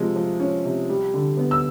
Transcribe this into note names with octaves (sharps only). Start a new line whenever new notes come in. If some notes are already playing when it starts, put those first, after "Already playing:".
Already playing: C3 F3 G#3
F3
C#4
C3
G3
D3
B3
E6